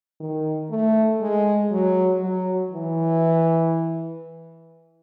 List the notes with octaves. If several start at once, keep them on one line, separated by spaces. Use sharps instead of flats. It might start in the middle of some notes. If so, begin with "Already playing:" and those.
D#3
A3
G#3
F#3
F#3
E3